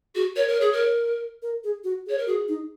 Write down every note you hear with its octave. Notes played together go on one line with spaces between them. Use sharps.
F#4 G#4
A#4 C#5
A#4
G#4 C#5
A#4
A#4
G#4
F#4
G#4
C#5
A#4
F#4 G#4
D#4